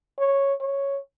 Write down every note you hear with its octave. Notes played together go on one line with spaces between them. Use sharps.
C#5
C#5